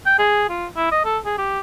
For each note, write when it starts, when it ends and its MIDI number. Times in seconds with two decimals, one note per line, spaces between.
0.06 0.15 79
0.19 0.49 68
0.50 0.67 65
0.77 0.89 64
0.92 1.02 75
1.05 1.19 69
1.25 1.36 68
1.38 1.61 67